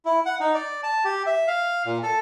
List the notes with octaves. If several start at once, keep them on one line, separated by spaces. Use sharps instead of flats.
E4
F#5
D#4
D5
A5
G4
E5
F5
A#2
A4